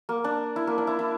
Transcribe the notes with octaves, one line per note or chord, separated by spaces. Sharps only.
A#3
D4
E4
A#3
D4
E4
E4